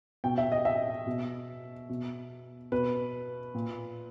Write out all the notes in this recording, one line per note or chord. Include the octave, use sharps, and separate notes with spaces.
B2 G5
E5
D#5
E5
B2
B2
B2 B4
A#2